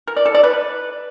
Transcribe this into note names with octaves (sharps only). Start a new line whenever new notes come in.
A#4
D5
A4
D5
B4